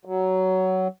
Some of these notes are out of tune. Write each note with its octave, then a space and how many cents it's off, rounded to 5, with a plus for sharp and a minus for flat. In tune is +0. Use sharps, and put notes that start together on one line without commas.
F#3 +15